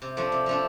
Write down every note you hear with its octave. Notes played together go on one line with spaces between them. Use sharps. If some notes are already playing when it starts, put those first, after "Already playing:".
C3
F3 A3 D4
C3
F3 A3 D4